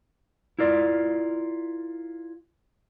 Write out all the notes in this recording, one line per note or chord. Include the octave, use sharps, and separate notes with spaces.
E4 F4 A#4 D5